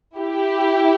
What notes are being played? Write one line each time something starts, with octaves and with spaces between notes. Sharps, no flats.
E4 G4